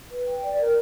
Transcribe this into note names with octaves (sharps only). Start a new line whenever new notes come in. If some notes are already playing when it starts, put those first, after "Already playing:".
B4
G5
D5
A#4